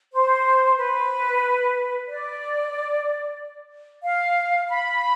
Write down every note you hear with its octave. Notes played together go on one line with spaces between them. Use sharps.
C5
B4
D5
F5
B5